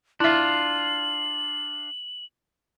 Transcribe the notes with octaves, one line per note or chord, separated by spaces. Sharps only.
D4 E4 F4 E5 F#7